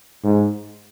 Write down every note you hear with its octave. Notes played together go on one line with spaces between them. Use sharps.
G#2